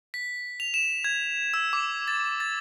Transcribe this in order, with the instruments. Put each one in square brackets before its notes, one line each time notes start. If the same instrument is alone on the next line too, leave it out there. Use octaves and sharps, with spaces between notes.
[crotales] B6
F7
E7
G#6
E6
D6
A6
A6